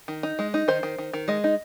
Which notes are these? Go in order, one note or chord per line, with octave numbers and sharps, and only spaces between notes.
D#3
D#4
G#3
D#4
D#3 C5
D#3
D#3
D#3
G#3 D#5
D#4